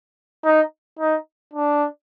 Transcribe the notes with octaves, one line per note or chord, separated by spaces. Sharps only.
D#4
D#4
D4